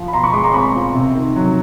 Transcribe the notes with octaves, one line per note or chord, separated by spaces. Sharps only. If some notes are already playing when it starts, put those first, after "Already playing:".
Already playing: F3
B5
B2 A#5 C6
B5 C#6
G#3 C6 D6
A#5 C6
C4 B5 C#6
F4
C3
D#3
F#3